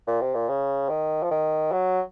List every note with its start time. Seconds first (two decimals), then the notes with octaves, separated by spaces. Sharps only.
0.07 A#2
0.21 C3
0.35 A#2
0.49 C#3
0.89 D#3
1.23 F3
1.31 D#3
1.72 F#3